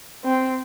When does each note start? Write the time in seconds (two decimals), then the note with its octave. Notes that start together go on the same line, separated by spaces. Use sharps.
0.25 C4